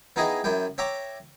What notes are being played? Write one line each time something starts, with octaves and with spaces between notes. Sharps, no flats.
B3 D#4 E4 G#4 D#5 G5
F#2 E4 G5
C#5 E5 G5 A#5 D6